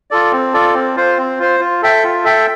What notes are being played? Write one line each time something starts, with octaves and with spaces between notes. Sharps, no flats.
F4 A4 D5
C4
F4 A4 D5
C4
F4 C5
C4
F4 C5
F4
A4 E5 G5
F4
A4 E5 G5